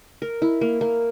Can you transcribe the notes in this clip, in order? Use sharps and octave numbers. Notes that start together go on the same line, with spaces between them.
A#4
E4
A#3
A#3